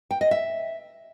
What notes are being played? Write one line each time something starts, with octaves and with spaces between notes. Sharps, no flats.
G5
D#5
E5